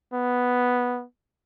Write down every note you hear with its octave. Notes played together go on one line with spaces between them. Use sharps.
B3